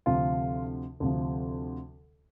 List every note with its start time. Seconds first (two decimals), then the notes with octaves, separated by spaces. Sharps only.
0.06 D2 C3 F3 F4
1.00 D2 C3 F3